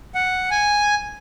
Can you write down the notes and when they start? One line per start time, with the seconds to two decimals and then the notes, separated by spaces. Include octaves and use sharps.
0.15 F#5
0.51 G#5